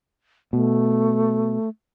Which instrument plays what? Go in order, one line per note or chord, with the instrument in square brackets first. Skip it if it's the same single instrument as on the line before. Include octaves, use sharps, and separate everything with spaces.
[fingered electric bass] B2 [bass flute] A3